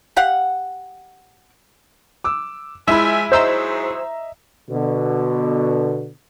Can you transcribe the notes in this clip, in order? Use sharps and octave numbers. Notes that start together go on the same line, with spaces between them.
G4 F5 F#5
D6 E6
F3 G#3 E4 E5 G#5 B5
G#2 F#3 G#4 C5 D#5 E5 A#5 E6
B2 D3